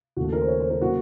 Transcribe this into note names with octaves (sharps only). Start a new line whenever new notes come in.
D#2 C#3 A3 F#4
A4
A#4
C5
C#5
C5
A#4
C#3 F#3 A#3 F#4